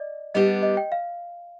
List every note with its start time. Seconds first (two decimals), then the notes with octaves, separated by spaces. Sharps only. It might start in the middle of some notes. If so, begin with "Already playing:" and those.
Already playing: D5 D#5
0.34 G3 B3 D4 G4 D#5
0.63 D#5
0.77 G5
0.92 F5